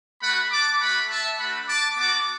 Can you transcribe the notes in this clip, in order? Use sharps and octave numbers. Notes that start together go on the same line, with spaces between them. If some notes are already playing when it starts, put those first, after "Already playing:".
A3 F#4 F#5 B5
A5 D6
A3 F#4 F#5 B5
E5 A5
A3 D4 F#4 F#5 B5
A5 D6
B3 F#4 A5 D6